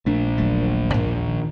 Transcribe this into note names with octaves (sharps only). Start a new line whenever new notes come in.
A#1 A3 D4
D#1 F#3 A3
G2 B2 A#3
D#2
D#3